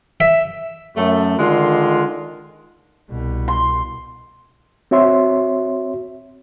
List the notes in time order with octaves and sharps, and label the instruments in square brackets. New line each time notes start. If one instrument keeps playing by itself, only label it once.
[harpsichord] E5
[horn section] F#2 A3
D3 D#3 G#3 F4
[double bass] C2 B2
[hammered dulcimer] C6
[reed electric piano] C4 F#4 C#5 E5 C6